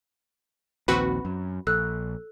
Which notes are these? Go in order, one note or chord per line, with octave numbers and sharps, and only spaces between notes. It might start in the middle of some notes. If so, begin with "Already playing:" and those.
A#1 D#2 C4 F#4 B4 B5
F#2
A#1 A4 E6 F#6